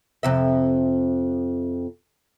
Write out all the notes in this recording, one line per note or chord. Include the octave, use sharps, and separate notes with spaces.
F2 C3 E5